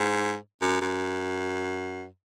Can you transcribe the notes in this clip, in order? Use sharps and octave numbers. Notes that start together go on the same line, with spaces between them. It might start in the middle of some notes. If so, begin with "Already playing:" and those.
Already playing: G#2
F#2
F#2